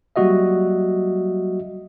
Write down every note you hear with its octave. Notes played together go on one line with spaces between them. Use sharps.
F#3 G3 A#3 F#4 D#5 E5